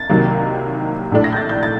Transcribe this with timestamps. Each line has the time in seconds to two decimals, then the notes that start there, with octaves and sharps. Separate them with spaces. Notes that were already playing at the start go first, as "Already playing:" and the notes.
Already playing: A6
0.10 C2 C3 D#3 F#3 A#3
1.12 A#1 A2 A3 D4
1.24 A#6
1.33 G6
1.36 A6
1.49 G6
1.63 A6